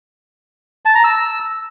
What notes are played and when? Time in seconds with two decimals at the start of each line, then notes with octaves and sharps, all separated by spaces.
0.85 A5
0.95 A#5
1.04 E6